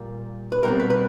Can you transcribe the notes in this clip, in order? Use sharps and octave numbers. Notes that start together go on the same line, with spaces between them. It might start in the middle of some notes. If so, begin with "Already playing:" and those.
Already playing: A#2 G3 A#3
B4
B2 G3 C4 A#4
B4
B4